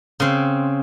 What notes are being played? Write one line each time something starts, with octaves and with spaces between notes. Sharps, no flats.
C#3 C4